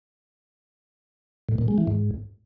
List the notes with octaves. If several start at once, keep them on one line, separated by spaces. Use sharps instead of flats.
A2
A#2
G#3
E3
G#2